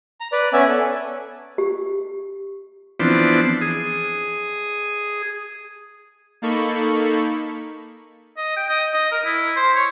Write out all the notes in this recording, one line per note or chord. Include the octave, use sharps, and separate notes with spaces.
A#5
B4 D5
B3 C#4 D5 E5 G#5
A4
G4
E3 F3 B3 C4 D4
G#4 D#6
A#3 D#4 A4 B5 C#6
D#5
G5
D#5
D#5
A#4
E4
C5
C#5